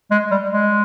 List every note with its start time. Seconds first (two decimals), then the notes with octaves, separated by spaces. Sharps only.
0.11 G#3
0.31 G3
0.51 G#3